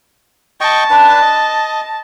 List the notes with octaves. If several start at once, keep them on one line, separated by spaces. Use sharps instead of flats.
D#5 G5 A5 C#6
D4 B4
D#5